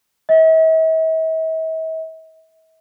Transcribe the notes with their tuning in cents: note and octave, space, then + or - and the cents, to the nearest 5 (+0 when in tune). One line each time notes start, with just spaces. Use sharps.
E5 -45